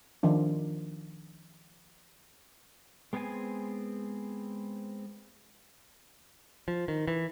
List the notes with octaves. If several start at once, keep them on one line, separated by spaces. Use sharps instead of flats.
D#3 F3 D4
G#3 B3 C4 G#4 G#5
F3
D#3
E3